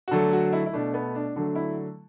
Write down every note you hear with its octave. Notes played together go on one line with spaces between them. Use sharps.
F#4
D3 F#3 A3 A4
F#4
E4
E4
B2 A3 D4
B3
D4
D3 F#3 A3 D4
E4